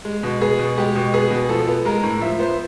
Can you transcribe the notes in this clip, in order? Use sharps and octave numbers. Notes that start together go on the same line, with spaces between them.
G#3
B2
B3 G#4
B2
G#3 G4
B2
B3 G#4
B2
F3 A4
B3
G#3 A#4
A2
F3 E5
B3 C5